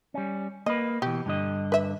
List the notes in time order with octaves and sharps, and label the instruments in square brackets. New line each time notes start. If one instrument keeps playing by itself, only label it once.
[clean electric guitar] G3 C#4
[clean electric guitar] A#3 B4 [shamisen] D#5
[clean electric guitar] B2 E3 [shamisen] G4
[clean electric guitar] G2 D3 D#5
[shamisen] B4 E5